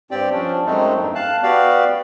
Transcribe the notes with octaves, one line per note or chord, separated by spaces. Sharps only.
G2 C4 G4 D5 G5
F3 C#4 D4
F#2 G#3 A3 C4 D#4
E2 G2
F5 A5 F#6
B3 F#4 G4 D5 F5